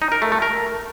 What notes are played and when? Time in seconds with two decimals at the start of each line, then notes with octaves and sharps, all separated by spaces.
0.02 D#4
0.12 A#4
0.22 A3
0.32 A3
0.42 A#4